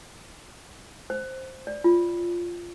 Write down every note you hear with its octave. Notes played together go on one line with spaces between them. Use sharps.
C5
D5
F4